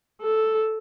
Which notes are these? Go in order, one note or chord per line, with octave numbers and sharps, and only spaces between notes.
A4